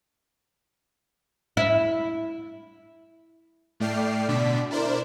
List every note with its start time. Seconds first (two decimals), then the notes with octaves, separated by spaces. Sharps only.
1.57 E4
3.80 A2 A3 D5 G5 F6 C7
4.28 B2 D3 D4 D5 B6
4.71 D4 E4 A#4 C5 D5